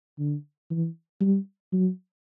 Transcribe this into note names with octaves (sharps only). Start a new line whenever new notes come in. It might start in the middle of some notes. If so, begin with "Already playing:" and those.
D3
E3
G3
F#3